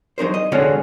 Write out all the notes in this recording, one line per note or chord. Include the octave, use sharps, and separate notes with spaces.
F#3 D#4 A#4 C5
D#5
D3 G#3 C#4 F#4 A4 C#5